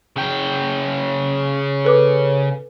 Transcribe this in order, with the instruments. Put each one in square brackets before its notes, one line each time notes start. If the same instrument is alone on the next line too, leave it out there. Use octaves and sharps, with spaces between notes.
[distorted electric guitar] C#3 G5
[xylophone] A4 B4 D6